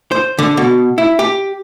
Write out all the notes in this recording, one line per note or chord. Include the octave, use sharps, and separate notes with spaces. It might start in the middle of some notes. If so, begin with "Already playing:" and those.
C5
D3
B2
E4
G4